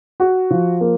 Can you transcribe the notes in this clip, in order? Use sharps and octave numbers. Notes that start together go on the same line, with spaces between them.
F#4
F3
A#3